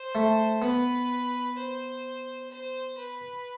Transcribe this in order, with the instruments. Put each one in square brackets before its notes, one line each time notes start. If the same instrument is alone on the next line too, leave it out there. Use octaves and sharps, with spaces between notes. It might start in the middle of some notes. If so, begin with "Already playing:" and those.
Already playing: [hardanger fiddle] C5
[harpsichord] A3
[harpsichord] B3 [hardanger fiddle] B4
[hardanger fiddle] C5
C5
B4